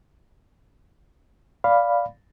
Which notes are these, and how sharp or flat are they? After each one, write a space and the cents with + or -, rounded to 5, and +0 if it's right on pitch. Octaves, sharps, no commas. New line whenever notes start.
D5 -10 F5 +0 B5 +0